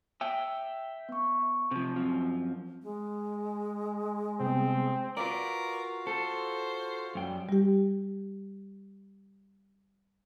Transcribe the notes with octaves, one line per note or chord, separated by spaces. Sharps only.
E5 G5
B3 C#6
C3 F3
F#2 F3 C4
G#3
C3 G3 B3 C4
F4 F#4 A#4 B4 D5 F5
A4 C5
F#2 F#3 G3 G5
G3 G4